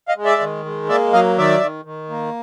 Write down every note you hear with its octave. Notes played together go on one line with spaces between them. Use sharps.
D#5 F5
G#3
D5 E5
D#3
G#3
A#3 D5 E5
F#3 D#5 F5
D#3 D5 E5
D#3
D#3
A#3